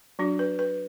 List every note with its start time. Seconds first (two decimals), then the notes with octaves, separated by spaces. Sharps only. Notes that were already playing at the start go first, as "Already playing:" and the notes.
0.19 F#3 D4 F#4
0.39 B4
0.59 B4